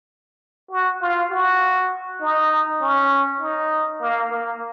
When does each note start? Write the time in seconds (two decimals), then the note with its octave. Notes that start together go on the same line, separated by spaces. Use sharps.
0.71 F#4
1.02 F4
1.31 F#4
2.21 D#4
2.82 C#4
3.41 D#4
4.01 A#3
4.31 A#3